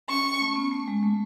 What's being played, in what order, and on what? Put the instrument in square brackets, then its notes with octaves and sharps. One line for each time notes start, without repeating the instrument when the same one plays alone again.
[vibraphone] C#4 [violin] C#6
[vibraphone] C#4
A3
C#4
B3
A3
G#3
A3